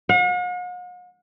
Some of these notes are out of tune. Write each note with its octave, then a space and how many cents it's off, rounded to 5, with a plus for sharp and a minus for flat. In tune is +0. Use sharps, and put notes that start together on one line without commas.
F#5 -45